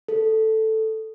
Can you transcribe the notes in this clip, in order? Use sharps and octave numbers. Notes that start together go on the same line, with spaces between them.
A4